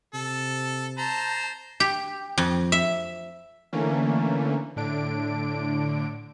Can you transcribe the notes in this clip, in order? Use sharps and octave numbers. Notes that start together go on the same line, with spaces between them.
C3 A4
C5 A5 A#5
G4
F2
E5
D3 E3 A3 A#3 C#4
A2 D3 D4 D7